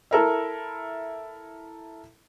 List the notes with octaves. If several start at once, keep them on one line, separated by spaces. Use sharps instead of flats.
E4 A4 A#4 E5